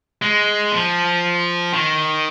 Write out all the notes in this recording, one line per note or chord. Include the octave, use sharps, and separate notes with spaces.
G#3
F3
D#3